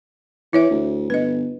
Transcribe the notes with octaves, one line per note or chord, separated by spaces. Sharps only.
E3 E4 C#5 E5
D2
G1 B4 D#5